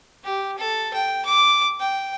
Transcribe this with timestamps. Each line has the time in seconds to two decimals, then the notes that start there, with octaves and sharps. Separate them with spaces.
0.24 G4
0.58 A4
0.94 G5
1.26 D6
1.81 G5